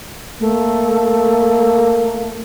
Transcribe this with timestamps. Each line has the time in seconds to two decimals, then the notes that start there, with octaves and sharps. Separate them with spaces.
0.40 A3 A#3